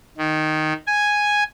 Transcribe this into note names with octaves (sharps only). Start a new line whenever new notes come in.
D#3
G#5